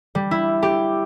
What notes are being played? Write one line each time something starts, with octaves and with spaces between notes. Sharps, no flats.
G3
E4
G4